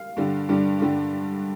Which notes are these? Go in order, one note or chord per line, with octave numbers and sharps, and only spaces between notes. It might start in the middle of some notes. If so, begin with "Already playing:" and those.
Already playing: F5
G2 D3 G3
G2 D3 G3
G2 D3 G3